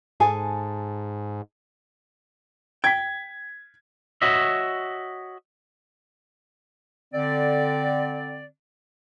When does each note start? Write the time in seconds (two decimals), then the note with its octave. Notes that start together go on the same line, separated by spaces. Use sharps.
0.20 G#2 G#4 A4 G#5
2.84 G5 G#6 B6
4.22 F#4 C#5 D#5 E5
7.13 D3 C4 D5